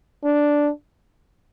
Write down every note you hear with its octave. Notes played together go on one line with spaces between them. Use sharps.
D4